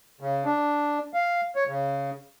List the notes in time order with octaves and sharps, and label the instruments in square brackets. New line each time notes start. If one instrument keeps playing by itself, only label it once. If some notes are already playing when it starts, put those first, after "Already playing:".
[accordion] C#3
D4
F5
C#5
C#3